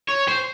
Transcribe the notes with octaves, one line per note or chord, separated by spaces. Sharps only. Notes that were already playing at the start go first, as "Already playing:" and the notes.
C#5
C5